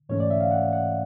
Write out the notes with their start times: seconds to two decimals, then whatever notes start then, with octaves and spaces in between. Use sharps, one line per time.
0.09 G#2 E3 A3 C#4 C#5
0.20 D5
0.30 E5
0.40 F5
0.51 F#5
0.72 F#5